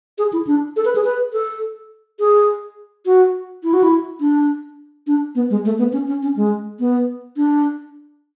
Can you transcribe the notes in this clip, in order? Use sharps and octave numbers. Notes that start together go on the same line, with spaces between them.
G#4
E4
D4
A4
B4
G#4
B4
A4
G#4
F#4
E4
F#4
E4
D4
D4
B3
G#3
A3
B3
C#4
C#4
C#4
G#3
B3
D4